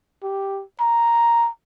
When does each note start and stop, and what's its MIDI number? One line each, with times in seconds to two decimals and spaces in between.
0.23 0.63 67
0.80 1.49 82